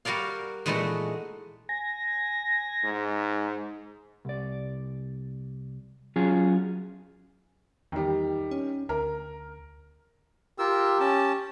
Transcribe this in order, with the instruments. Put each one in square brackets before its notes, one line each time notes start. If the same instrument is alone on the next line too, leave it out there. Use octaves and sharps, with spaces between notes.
[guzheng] G3 F#4 A#4 D5 F5
A#2 E3 G#3 A3 D#4 F#4
[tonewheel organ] G#5 A#6
[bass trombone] G#2
[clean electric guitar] C2 D5
F#3 C#4 F4 G#4
[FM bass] E2 [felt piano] D#3 G3
[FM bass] C#4
[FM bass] D2 [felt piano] A#4
[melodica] F4 A#4 E6 [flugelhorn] G4
[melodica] C#4 A5